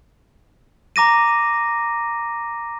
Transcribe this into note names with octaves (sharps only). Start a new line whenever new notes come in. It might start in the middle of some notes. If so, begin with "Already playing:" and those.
A#5 D6 A#6 D#7